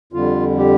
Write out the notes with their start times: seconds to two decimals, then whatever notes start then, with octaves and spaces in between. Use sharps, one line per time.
0.13 F2 D3 G3 F4
0.58 G4